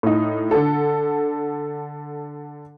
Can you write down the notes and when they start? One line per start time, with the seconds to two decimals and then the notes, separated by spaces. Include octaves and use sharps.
0.03 A2 D#4
0.51 D3 A4